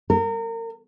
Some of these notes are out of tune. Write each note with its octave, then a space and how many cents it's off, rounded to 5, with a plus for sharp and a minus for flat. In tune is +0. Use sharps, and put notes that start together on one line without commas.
A#4 -30